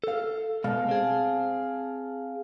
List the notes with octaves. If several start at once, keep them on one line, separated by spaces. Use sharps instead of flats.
A4 F5
B2 G#3 F5 A5
C4 G#4